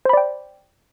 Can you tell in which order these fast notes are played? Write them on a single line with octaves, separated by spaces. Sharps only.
C5 B5 D5 G5